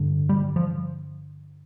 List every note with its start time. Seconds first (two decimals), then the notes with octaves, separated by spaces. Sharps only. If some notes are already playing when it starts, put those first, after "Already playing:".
Already playing: G2 D3
0.29 G3
0.56 F3